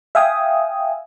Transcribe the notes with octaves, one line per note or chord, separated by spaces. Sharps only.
E5 F5 G5 G#5 D#6